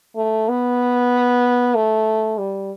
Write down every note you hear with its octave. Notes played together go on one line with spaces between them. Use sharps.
A3
B3
A3
G3